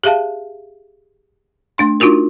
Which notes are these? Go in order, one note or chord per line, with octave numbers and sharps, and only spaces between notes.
G4 G#4 E5 F5 A5
A3 D4 C6
D4 D#4 F4 F#4 A#4